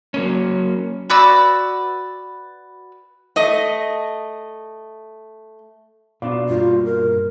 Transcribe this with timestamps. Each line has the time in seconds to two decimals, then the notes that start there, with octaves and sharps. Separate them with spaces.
0.14 F#3 A#3 C#4
1.10 F#4 B4 D5 E6
3.36 A3 D#5
6.22 B2 D4 F4 D5 F5
6.49 G2 G3 A#3 F4
6.85 A#4